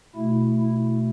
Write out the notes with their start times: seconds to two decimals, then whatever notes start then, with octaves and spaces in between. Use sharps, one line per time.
0.16 B2 A3 E4
0.60 E4